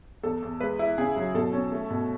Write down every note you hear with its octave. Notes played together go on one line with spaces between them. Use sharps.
E2 A4
E2
G#3 B4
E4
C#3 G#4
F#3
B2 A4
C#4
A3
B2